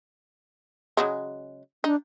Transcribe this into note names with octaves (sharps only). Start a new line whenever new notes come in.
C#3 F#3 G#3
D4 D#4